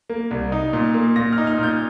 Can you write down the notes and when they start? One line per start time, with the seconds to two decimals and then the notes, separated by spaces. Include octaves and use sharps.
0.10 A#3
0.31 C2
0.52 D#4
0.73 A#2
0.94 A#3
1.16 A#2 A#6
1.32 F6
1.38 D#4
1.47 F6
1.58 A#2 G6